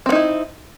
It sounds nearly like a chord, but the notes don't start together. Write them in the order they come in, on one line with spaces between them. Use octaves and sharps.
C4 B3 D#4 E4